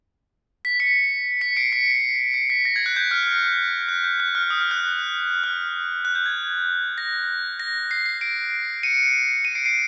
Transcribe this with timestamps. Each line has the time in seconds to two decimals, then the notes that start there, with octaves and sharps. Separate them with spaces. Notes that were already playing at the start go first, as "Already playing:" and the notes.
0.65 B6
0.80 B6 C#7
1.41 B6 C#7
1.57 C7 D7
1.72 B6 C#7
2.34 C7
2.50 B6
2.65 A#6
2.76 G#6
2.86 F#6
2.96 G6
3.11 F6
3.27 F6
3.89 F#6
4.04 G6
4.20 F#6
4.35 F6
4.50 D#6
4.61 F6
4.71 F#6
5.44 F6
6.05 F#6
6.15 G6
6.26 G#6
6.98 A#6
7.60 A#6
7.91 C7
8.06 C7
8.21 C7 D7
8.83 C#7 D#7
9.45 C#7 D#7
9.55 C7 D7
9.65 C7 D7